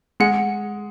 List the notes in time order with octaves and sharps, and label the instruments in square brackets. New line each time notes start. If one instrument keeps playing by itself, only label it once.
[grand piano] G#3 [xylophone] F#5